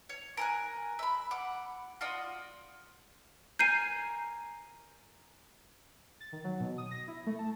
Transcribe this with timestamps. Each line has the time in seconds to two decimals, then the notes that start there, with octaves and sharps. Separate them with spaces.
0.09 C#5
0.37 A#4 G#5 F#6
0.99 E5 B5
1.31 F#5 D6
2.01 F4 F#4 D5 D#5
3.59 A#4 G#5 G6 C7 D#7
6.20 A6
6.32 D#3
6.44 F#3
6.60 B2
6.78 D#6
6.91 A#6
7.08 E4
7.27 A3
7.39 A5